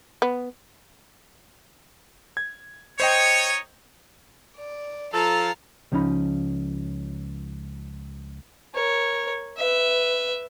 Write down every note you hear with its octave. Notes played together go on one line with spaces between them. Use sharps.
B3
G#6
D#4 C5 C#5 D#5 G5
D5
F3 A4 F5 A5 A#5
C#2 F3 C#4 D#4 B5
A#4 C#5
B4 E5